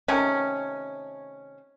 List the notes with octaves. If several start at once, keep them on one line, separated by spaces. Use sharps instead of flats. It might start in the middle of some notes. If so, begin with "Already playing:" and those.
C3 D#3 A3 C#4